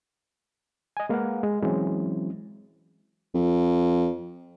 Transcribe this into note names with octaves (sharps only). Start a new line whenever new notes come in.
D#5 G#5
G#3 A#3 A#4 B4 F5 F#5
G#3
E3 F#3 G#3 C4 C#4 E4
F2